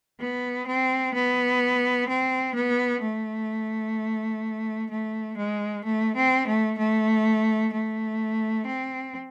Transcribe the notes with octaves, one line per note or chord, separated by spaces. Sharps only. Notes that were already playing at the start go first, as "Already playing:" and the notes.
B3
C4
B3
C4
B3
A3
A3
G#3
A3
C4
A3
A3
A3
C4